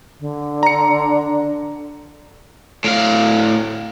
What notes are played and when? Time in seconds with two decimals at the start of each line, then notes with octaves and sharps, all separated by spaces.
0.20 D3
0.63 D4 A#5 C#7
2.84 A2 F5